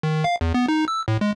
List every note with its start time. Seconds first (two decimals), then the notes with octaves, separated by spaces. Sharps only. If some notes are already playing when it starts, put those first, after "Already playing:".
0.03 D#3
0.24 F5
0.41 E2
0.54 B3
0.68 D#4
0.88 E6
1.08 A2
1.21 G#3